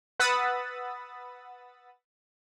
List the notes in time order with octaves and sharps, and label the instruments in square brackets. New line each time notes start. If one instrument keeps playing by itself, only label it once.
[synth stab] B4 F#5 B5 D#6 E6 A6